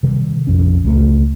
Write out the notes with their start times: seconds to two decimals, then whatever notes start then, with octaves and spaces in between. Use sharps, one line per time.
0.03 C3 D#3 G3
0.47 A#1 F2 C#4
0.84 C#2 A3